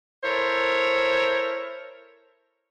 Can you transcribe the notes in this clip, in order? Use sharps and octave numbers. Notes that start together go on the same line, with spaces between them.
E4 A4 A#4 C5 C#5